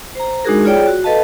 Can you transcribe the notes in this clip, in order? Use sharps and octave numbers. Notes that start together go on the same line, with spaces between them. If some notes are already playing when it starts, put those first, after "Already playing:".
C5 A#5
G#3 D4 D#4 F#4 G#4 A#4
F4 G#4 C#5 D5 G5
F#4
A4 B4 D#5 F5 A5